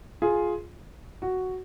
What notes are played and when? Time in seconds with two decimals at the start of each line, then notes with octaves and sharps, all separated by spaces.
0.22 F4 G#4
1.22 F#4